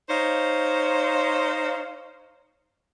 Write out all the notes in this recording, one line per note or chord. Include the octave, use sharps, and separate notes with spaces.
D#4 C5 C#5 F5